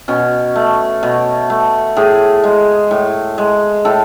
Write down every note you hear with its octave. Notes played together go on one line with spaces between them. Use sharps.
B2 C#4
A3
B2
A3
A2 G#4
G#3
A2
G#3
A2 A4